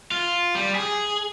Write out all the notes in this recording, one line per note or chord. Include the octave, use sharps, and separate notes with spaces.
F4
G3
G#4